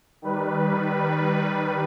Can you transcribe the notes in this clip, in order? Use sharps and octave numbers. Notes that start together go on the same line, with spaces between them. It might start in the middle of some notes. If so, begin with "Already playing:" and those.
D#3 G3 B4